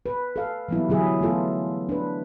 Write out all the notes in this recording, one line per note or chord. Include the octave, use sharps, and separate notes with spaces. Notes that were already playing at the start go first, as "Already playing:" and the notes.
B4
A4 F5
E3 F#3 G3 B3 E4
D3 F#3 E4 G#4 E5
A3 B3 F4 A4
D4 B4